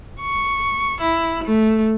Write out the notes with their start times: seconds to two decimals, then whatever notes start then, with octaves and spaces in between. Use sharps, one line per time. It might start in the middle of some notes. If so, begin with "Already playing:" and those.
0.21 C#6
1.01 E4
1.44 A3